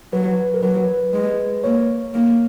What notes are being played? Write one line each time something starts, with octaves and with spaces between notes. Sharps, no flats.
F#3 B4
A#4
F#3 B4
G#3
A#3 C#5
A#3